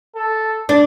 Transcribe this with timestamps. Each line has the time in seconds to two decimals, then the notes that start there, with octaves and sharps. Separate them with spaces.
0.16 A4
0.69 D4